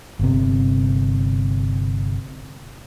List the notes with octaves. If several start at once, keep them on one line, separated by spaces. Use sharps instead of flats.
G1 C3